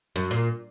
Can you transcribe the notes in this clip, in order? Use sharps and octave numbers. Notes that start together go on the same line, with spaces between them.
F#2
A#2